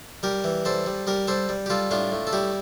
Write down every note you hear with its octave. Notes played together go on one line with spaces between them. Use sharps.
G3 G4 A#4
E3
G3 A4 C5
G3
G3 G4 A#4
G3 A4 C5
G3
G4
G3 F4 A4
A2 D4 F4
A2
A4
G3 E4 G4